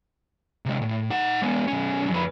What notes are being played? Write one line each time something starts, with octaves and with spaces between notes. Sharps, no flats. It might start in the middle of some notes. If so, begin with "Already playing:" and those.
C3 G#3
A2
D#4 F#5
G#3 B3
B1 C#4
F2 B4